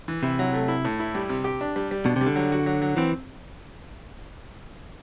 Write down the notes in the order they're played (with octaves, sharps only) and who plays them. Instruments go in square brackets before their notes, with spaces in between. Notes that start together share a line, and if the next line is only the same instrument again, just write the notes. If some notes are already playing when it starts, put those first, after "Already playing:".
[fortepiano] E3
[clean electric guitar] C3 [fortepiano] E4
[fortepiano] F#3
A3
E4
A2
E4
G3
C3
G4
D4
G3
G3
[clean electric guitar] B2 [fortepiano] D4
[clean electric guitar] C3 [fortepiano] G3
[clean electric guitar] D3
[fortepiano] F#3
F#4
F#3
F#3
[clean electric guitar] E3 [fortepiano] C4